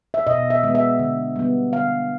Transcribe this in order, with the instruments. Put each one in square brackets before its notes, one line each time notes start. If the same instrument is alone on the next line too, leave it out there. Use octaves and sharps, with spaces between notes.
[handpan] E5
B2 D#5
E5
G#3 B3
E5
D3
G3 B3
D3 F5